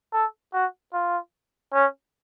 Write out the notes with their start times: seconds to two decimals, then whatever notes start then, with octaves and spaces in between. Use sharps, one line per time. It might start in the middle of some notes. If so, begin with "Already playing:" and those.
0.13 A4
0.54 F#4
0.93 F4
1.74 C#4